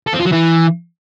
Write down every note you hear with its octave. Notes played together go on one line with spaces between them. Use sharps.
A4
C4
F4
F#3
E3